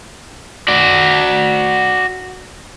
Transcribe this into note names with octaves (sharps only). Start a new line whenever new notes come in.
F#4 D5